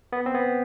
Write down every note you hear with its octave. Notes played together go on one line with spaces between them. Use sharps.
B3
C4
B3